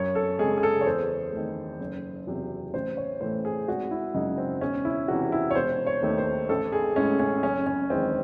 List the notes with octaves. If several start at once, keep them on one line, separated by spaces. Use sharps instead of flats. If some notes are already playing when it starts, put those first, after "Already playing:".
Already playing: F#2 C#5
A4
C#3 G#3 G#4
G#4
A4
C#5
E2 C5
D#3 A3
F#1
E2 C3 F#3
A1 C5
C#5
A2 E3 A3 C5
G#4
G#1 F#4
E4
F#2 C#3 G#3 D#4
C4
E1 C#4
E4
E2 C3 E3 F#4
E4
C#5
E1 C5
C#5
D#2 D#3 A3
C5
A1 A4
G#4
A2 G#3 C#4
C#4
F#1 C#4
C#4
E2 D#3 G#3 C4